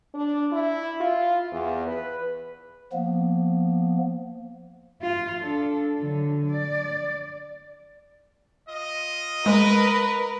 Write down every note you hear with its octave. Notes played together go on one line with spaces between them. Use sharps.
D4
E4
F4
E2
B4
F3 A#3 B3
F4
D4 A4
D3 F#3
D5
F4 D#5
G#3 A#4 B4